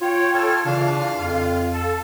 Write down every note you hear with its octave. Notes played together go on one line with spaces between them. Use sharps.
F4 C#5 G5
A4 C#5 F6
C#3 E3 D4 F5
F2 F4
A4